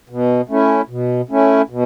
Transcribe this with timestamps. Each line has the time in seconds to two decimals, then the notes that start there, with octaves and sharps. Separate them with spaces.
0.10 B2
0.49 A3 C#4 E4
0.89 B2
1.30 A3 C#4 E4
1.69 B2